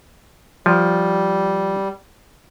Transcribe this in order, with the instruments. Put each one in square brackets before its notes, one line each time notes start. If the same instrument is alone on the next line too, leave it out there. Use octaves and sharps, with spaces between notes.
[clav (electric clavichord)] F3 [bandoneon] G3